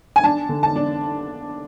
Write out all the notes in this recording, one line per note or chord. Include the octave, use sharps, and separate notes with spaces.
G#5
D4 A5
D3
A5
D4